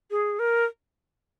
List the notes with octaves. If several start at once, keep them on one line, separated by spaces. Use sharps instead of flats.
G#4
A#4